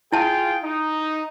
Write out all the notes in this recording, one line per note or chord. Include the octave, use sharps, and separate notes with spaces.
E4 F4 G#4 G5 A5
D#4